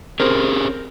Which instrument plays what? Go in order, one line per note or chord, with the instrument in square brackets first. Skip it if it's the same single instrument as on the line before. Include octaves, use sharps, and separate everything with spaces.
[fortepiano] C4 A#4 [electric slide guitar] C#4 G4 G#4